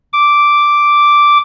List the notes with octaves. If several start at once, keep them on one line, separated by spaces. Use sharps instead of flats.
D6